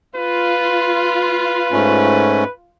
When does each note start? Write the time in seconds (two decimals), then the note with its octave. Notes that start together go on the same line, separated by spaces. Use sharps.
0.16 F4 B4
1.72 G#2 A3 C#4